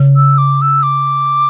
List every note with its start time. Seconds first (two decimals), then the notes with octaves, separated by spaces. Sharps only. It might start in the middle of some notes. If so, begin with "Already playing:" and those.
Already playing: C#3
0.16 E6
0.38 D6
0.62 E6
0.83 D6